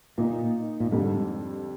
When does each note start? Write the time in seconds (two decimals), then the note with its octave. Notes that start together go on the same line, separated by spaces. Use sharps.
0.18 A#2 D#3 A#3 D#4
0.80 A#2
0.92 F2 G#2 D3 G3